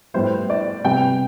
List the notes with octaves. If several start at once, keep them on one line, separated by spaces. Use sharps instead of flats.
A2 G3 B3 C5
D5
C3 G3 B3 G5